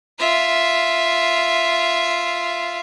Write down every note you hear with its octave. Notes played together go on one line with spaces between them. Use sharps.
F4 E5